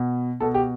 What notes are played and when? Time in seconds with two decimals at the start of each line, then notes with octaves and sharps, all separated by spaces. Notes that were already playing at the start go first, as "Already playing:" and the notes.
Already playing: B2
0.40 B2 A4
0.54 G4